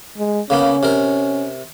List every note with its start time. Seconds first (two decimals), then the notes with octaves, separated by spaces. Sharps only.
0.18 G#3
0.50 C#3 A#3 B3 C#4
0.83 C3 A#4